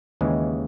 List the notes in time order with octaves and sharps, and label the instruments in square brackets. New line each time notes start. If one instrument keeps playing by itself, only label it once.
[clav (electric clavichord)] D#2 C#3 E3 G#3